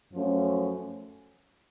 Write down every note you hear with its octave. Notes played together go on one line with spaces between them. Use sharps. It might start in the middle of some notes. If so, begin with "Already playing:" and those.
F#2 F3 A3 C#4